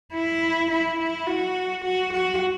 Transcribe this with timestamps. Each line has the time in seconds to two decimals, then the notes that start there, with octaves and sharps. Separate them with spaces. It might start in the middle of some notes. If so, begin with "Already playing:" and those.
0.13 E4
0.70 E4
0.99 E4
1.27 F#4
1.84 F#4
2.13 F#4